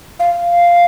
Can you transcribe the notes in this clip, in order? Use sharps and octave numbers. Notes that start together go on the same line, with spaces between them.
F5